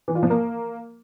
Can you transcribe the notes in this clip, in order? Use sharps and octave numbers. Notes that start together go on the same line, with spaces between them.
E3
F4
F3
A#3